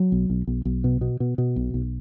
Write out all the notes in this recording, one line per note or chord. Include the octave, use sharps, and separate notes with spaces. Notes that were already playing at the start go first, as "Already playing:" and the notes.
Already playing: F#3
B1
B1
B1
B1
B2
B2
B2
B2
B1
B1